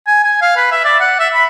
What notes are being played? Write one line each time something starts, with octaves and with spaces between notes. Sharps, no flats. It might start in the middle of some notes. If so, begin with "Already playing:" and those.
G#5
G#5
F5
B4
E5
D5
F#5
E5
B5